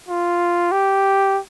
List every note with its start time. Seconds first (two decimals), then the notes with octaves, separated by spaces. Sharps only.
0.09 F4
0.72 G4